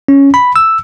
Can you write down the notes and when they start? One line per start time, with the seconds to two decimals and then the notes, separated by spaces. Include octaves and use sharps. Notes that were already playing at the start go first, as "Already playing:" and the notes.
0.08 C#4
0.34 B5
0.56 E6